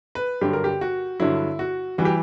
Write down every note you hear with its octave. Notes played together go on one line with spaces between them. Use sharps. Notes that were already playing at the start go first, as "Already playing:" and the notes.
B4
G2 D3 F#3 G4
A#4
G4
F#4
G2 D3 F#3 E4
F#4
E3 G3 F#4
G4